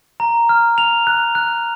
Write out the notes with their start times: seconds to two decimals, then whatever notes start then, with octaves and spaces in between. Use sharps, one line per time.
0.20 A#5
0.49 F6
0.78 F7
1.07 F#6
1.35 F#6